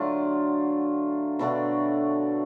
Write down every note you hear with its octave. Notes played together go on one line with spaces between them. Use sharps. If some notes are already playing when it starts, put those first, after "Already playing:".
Already playing: D3 F#3 A3 F4
B2 A3 D4 F#4